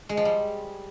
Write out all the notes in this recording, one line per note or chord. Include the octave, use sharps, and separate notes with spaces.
G#3
F3
G3